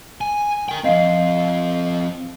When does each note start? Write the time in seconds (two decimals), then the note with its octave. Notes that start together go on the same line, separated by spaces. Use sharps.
0.21 G#5
0.69 A#4 G5
0.84 F3 C4 D#5 F5 C7